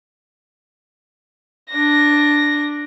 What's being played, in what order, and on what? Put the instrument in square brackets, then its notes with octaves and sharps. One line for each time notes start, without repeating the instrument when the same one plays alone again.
[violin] D4 A#6